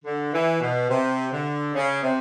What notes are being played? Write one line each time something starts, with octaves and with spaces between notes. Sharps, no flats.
D3
E3
B2
C3
D3
C#3
C3